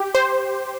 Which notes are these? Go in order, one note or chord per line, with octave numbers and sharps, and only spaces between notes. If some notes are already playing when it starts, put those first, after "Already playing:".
Already playing: G4
C5